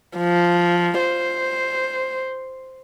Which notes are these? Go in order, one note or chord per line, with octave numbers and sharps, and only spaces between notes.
F3
C5